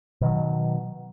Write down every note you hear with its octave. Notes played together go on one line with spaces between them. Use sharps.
B2 D#3 F#3